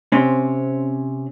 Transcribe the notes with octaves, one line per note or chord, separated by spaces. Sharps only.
C3 C4 C#4